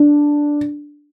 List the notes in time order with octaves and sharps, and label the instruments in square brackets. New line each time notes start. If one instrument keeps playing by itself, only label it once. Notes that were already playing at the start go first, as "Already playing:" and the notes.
Already playing: [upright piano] D4